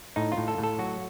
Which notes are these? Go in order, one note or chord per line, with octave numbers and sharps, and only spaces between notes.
A2 D#4
F4
A2
A4
A2
A4
F#3 F#4